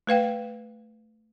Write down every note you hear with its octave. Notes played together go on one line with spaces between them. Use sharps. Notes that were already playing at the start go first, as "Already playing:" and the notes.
A3 B4 F5 G5